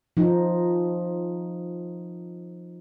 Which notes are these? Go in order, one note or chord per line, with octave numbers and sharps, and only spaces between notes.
F3 D#4